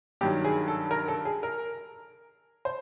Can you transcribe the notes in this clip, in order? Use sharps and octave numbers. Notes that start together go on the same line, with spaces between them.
G2 D#3 F#3 G4
G#4
A4
A#4
A4
G#4
A#4
C5